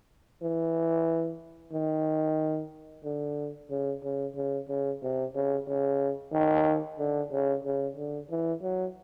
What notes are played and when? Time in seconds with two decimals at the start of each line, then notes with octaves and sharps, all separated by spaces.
0.42 E3
1.73 D#3
3.04 D3
3.71 C#3
4.03 C#3
4.36 C#3
4.68 C#3
5.02 C3
5.35 C#3
5.67 C#3
6.33 D#3
6.99 D3
7.32 C#3
7.65 C#3
7.97 D3
8.30 E3
8.62 F#3